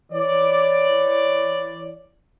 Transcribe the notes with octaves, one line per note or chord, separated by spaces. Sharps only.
E3 C#5 D5